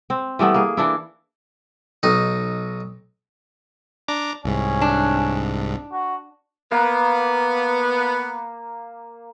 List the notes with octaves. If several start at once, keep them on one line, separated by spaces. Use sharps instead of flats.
C4
E3 G3 A3 B3
A#3 G#4
E3 D4 E4
B1 D#4
D4 A#5 D6
C2 G#2 C#4
D4
F#4
A#3 B3